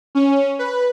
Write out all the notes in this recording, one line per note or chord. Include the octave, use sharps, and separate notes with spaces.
C#4
B4